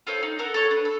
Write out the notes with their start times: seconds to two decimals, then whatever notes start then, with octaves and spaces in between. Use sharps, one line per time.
0.07 F4 A4 C5 C#5
0.23 D#4
0.39 A4 A#4 F#5
0.54 A4 C#5
0.71 D4 B4
0.85 A4